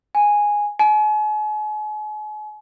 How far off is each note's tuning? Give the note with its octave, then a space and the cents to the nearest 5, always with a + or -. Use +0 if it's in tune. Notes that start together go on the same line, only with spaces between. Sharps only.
G#5 -5
G#5 +40